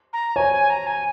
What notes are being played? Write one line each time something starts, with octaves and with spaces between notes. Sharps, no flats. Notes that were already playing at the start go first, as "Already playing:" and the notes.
A#5
C#5 G#5
G#5
A#5
G#5